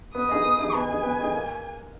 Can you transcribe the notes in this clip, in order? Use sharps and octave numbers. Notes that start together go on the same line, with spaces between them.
B3 D#6
D#4 G#4 D#5
B3
D#4 G#4 D#5
B3 G#5
D#4 G#4 D#5
B3
D#4 G#4 D#5
A#3